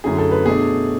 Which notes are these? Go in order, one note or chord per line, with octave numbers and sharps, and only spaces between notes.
F#2 D3 A3 E4 G#4
A4
B4
B2 A3 D4 G#4